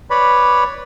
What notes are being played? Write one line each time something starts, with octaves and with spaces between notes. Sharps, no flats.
B4 C#5 D5 B5